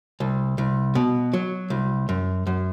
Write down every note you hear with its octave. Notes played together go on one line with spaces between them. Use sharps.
C2
C2
B2
F#3
C2
F#2
F#2